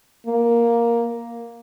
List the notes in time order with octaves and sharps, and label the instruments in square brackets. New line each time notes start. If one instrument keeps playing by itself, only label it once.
[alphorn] A#3